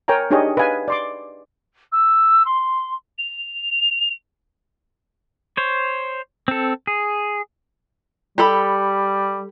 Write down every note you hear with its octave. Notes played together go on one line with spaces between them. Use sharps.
A#4 C#5 G5 G#5 A#5
D4 D#4 G4 G#4 C#5 D#5
B4 D#5 F5 G#5
D5 C6 D6
E6
C6
F7
C5 C#5
C4 A4
G#4
G3 G4 A4 B5